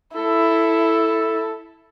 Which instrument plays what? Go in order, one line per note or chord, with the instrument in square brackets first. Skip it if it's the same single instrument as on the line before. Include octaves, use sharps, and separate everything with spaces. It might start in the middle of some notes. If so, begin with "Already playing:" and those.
[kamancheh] E4 [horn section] A4